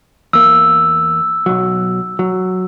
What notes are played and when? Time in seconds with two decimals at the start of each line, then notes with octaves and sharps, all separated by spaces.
0.33 E2 A#3 E6
1.46 B1 F#3
2.19 F#3